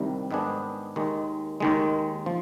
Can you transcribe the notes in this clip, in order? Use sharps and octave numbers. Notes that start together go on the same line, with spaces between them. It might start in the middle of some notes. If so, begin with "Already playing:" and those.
Already playing: C2 C3 D#3 G3
G#2 D#3 B3 D4 G#4
D#2 D#3 G#3
D#2 D#3 G#3
F3